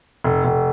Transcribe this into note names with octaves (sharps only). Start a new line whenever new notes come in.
F1
F1